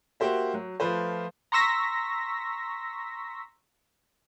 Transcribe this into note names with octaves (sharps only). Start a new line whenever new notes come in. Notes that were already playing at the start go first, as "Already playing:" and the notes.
A#3 F#4 G4 C5 E5
F#3
F3 A3 F4 B4 C5
A#5 C6 C#6 E6 A#6 B6